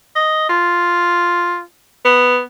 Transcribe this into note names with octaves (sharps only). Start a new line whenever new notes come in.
D#5
F4
B3